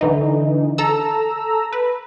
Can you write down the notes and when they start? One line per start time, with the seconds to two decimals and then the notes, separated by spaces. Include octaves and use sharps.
0.01 D3 E3 D#4
0.78 A4 A#5 E6
1.73 B4